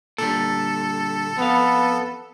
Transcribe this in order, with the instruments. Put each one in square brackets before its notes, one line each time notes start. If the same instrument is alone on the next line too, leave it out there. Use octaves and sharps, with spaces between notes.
[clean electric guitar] A#2 D3 G3 [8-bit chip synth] A4
[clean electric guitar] F2 F5 [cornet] B3